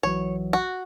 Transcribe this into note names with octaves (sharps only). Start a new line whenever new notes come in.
B1 E3 F#3 C#5
F#4